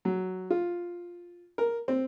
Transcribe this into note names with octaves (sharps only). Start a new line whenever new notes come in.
F#3
F4
A#4
C4